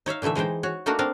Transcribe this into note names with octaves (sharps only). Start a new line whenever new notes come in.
D#4 C#5 E5 F5
A#2 D3 E3 A3 E5
E3 G#3 D#4 C5 G5
F#4 C#5
A3 A#3 D4 D#4 F#4 A#4
C4 D4 A#4 F5